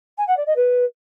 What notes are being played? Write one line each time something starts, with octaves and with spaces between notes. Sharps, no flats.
G#5
F#5
D5
D#5
B4